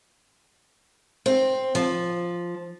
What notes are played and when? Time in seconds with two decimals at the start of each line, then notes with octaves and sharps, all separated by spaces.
1.26 C4
1.75 F3